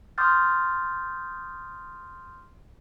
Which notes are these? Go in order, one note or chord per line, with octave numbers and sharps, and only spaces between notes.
C6 D6 D#6 F6 G6 A6